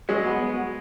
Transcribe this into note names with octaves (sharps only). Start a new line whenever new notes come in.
F#3 G#3
B3